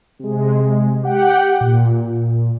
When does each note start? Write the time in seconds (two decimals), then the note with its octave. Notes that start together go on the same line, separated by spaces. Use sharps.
0.19 C3 G#3
1.03 G4 F#5 G5
1.61 A#2